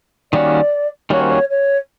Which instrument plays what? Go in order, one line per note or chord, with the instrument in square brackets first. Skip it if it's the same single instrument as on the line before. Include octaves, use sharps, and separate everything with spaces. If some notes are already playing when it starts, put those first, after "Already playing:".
[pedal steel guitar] D#3 G3 A#3 C#4 F#4 [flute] D5
[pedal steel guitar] D#3 G3 A#3 C#4 F#4 [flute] C#5
[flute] C5
C#5
C#5